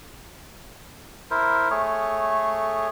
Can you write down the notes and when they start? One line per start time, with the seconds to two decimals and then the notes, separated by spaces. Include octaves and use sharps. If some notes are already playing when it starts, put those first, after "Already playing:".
1.31 E4 A#4 C5
1.71 A3 G#4 C#5